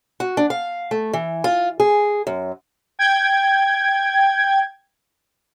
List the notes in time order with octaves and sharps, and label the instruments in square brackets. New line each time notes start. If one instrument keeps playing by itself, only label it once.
[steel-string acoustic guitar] F#4
D4
F5
A3
E3
F4
G#4
F#2
[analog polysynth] G5 G#6